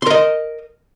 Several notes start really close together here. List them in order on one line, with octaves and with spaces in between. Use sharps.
C6 A#4 D#5